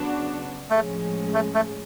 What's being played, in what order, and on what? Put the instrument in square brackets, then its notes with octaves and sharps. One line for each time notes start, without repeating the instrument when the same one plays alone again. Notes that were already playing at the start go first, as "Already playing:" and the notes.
Already playing: [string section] C#3 F#3 B3 D4 F#4
[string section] A2 F3 G#3 C#4 [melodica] A3
[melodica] A3
A3